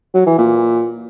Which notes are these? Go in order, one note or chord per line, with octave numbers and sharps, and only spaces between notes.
F#3
E3
A#2